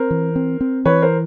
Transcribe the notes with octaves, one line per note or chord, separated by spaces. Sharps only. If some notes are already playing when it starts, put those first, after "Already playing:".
Already playing: C4 A#4 C5
E3
C4
C4
E3 B4 C#5
A#4 C5